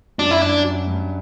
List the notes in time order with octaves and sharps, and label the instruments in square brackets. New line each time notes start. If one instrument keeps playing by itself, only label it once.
[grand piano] F#2 [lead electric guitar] D4
[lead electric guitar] E4
[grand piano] G2 [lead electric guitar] D4
[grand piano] F#2
G2